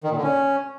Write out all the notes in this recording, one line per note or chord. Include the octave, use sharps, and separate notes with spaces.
D#3
A#2
D3
C#4